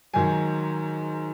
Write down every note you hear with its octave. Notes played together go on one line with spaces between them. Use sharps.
G#2 D#3 F#3 G#5